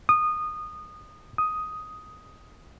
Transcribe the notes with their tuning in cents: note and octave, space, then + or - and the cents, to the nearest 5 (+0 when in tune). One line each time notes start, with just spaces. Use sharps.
D#6 -20
D#6 +5